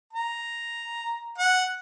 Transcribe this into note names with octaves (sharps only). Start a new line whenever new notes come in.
A#5
F#5